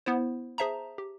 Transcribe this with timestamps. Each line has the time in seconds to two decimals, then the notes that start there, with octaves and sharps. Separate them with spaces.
0.06 B3 E4 C5
0.58 G#4 C5 E5 A5 A#5
0.98 G4